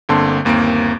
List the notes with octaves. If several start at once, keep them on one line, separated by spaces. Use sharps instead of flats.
G1 D3 A#3 C4 A5 C6
G1 D#2 A#3 C4 A#5 D7